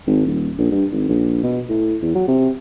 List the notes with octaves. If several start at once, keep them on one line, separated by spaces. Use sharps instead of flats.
G#1
D#1
A#1
G2
G#1
A#1
B2
A2
E2
F#3
C3